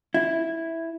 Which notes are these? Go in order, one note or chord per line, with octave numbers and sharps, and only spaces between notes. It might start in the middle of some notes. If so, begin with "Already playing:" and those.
E4